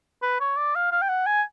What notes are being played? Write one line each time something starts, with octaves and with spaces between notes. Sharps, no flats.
B4
C#5
D5
F5
F5
G5
F#5
G#5